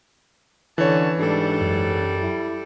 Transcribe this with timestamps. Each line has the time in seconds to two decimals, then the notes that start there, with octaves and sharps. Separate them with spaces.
0.78 D3 E3 C#4 C#5 A5
1.19 G#2 G3 D4 A4
1.61 F#2
2.21 E4